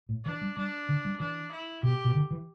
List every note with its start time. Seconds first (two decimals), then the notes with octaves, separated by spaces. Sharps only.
0.09 A2
0.25 E3 D4
0.42 G3
0.57 G3 D4
0.89 D3
1.05 G3
1.20 E3 D4
1.52 E4
1.83 B2 G4
2.05 B2
2.15 D3
2.31 E3